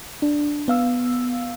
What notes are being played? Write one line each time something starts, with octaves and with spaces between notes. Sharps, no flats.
D4
B3 F5 E6